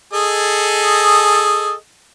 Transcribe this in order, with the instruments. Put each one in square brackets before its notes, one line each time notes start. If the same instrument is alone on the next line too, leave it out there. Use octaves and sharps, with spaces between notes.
[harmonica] G#4 A4 D#5